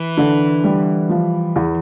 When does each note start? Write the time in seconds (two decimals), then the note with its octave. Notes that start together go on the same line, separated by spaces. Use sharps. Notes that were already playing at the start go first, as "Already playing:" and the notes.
Already playing: E3
0.17 D3
0.64 G3
1.09 F3
1.56 E2